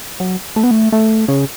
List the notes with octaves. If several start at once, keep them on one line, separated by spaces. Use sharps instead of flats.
F#3
A3
B3
A3
A3
C#3